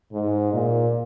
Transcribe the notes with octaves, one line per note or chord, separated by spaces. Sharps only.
G#2
A#2